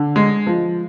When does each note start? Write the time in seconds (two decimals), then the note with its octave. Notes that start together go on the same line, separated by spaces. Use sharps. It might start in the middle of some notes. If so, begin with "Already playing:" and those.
Already playing: D3
0.16 G#3
0.47 F3